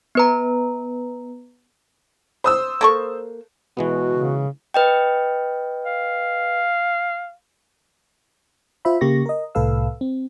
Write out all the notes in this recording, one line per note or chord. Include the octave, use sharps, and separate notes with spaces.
B3 B4 A#5
C5 D#6 E6
A#3 A4 C#6
B2 E3 G#3 B3 F#4
C#3
B4 D#5 G5
F5
F4 C5 E5 B5
C#3 A#3 G4 C#6 A#6
A#4 D#5
C2 A2 A4 B4 F5 E6
C4